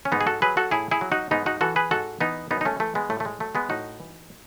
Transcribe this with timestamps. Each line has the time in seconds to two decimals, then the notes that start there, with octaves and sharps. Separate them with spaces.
0.05 C#4
0.12 G#2 B3 D#4
0.21 G#4
0.27 F#4 A4
0.42 F#3 G#4 B4
0.57 F#4 A4
0.71 A2 E4 G#4
0.91 E4 G#4
1.01 F#3
1.12 D#4 F#4
1.31 G#2 B3 D#4
1.46 D#4 F#4
1.61 E3 F#4 A4
1.76 G#4 B4
1.91 G#2 F#4 A4
2.21 E3 B3 D#4
2.51 F#2 B3 D#4
2.61 D#4
2.65 A3 C#4
2.80 E3 A3
2.95 G#3 B3
3.10 A2 A3
3.20 A3
3.25 G#3
3.40 F#3 A3
3.55 G#3 B3
3.70 A2 D#4 F#4
4.00 E3